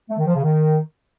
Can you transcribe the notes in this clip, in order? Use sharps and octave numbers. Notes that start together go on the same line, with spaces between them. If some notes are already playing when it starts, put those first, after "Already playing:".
A3
D#3
F3
C#3
D#3